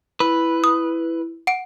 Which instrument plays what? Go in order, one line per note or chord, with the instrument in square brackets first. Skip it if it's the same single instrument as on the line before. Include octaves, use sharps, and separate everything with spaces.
[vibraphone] E4 [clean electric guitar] B4
[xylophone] D#6
F#5 D7